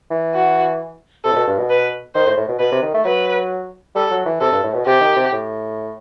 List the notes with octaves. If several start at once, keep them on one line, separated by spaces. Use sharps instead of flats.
E3
F#4
C3 A4
A2
B2
G2
B2
B4
D#3 C5
A2
A2
B2
B2 B4
C3
D#3
A3
F#3 B4
G3 A4
F#3
E3
C3 A4
G2
A2
B2
C3 G4
D#3
C3
A2